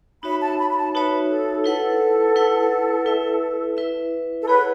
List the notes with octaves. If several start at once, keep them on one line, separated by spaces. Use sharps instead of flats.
D#4 F#4 C#5 E5 B5
A5
B5
B5
A5
D#4 F#4 B4 C#5 E5
A4
E4 A4 B4 F#5
E4 B4 F#5
E4 B4 E5
E4 B4 E5
A4
E4 G#4 B4 C#5 F#5